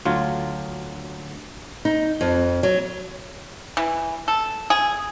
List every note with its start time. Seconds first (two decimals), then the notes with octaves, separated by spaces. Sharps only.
0.05 D2 F#3 F4
1.85 D#4
2.21 F2
2.63 F#3
3.77 E3
4.28 A4
4.70 G#4